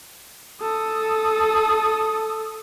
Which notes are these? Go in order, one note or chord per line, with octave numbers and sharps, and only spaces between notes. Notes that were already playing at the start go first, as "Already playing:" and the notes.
A4 D#6